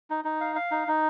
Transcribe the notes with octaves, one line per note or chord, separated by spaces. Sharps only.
D#4
D#4
F5
F5
D#4
D#4